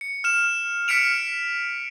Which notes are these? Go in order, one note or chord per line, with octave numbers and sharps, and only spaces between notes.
C#7
F6 E7
F6 B6 C#7 D7 F7